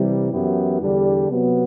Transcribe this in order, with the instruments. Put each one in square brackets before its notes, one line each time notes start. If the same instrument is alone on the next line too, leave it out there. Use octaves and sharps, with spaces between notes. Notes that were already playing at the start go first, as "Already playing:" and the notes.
Already playing: [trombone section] C3 E3 G3
F#2 E3 B3 E4 G4
E2 D3 G3 D4 G4
C3 F#3 B3